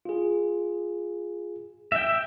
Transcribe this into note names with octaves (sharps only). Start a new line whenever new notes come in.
F4 G#4
E5 G5